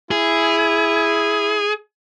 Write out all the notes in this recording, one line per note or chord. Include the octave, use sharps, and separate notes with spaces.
E4 G#4